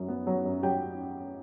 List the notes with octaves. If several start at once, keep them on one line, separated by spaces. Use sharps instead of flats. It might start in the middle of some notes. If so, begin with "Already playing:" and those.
Already playing: F#2 F#3
B3
F#3
F#2
F#3 G4 G5